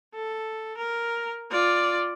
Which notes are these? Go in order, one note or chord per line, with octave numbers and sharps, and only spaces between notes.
A4
A#4
F4 D5